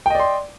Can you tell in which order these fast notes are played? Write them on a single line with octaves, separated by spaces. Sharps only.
G5 D#5 D5 C6